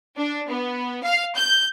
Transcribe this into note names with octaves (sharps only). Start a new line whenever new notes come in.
D4
B3
F5
G6